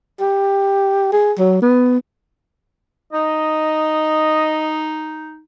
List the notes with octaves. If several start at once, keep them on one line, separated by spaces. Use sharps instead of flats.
G4
G#4
F#3
B3
D#4 D#5